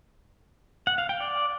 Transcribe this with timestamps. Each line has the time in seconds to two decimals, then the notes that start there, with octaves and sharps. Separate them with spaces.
0.87 F#5
0.98 F5
1.09 G5
1.20 D5